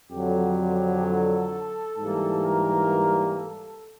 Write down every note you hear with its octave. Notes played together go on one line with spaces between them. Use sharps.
F2 D3 F#3 G4
A4
G#2 E3 G3 A#3
A#4
A4